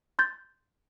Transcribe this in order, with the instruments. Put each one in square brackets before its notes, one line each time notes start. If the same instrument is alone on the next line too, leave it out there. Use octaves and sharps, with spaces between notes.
[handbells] C6 G6 A6